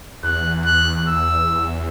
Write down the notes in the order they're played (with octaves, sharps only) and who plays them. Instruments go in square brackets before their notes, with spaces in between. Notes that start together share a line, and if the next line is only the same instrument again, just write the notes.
[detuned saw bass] E2 [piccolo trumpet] F#6
[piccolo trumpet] F#6
E6